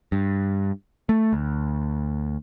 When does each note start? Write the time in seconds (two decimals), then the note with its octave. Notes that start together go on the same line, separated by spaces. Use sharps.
0.12 G2
1.09 A3
1.33 D2